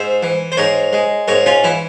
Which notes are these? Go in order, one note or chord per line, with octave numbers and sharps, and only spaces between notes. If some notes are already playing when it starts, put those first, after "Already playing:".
Already playing: G#2 C5 E5
E3
C5
G#2 A#4 C#5
G#3
G#2 A#4 C#5
C#4 F4
E3 E4